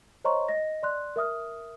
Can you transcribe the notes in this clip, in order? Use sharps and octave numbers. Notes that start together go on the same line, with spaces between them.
C5 C#5 D#5 A#5 C6 C#6
D#5 A#6
D5 C6 F#6
A#4 E5 D#6 F6